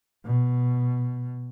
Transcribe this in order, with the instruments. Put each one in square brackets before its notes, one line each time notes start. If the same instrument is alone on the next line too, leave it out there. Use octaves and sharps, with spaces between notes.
[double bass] B2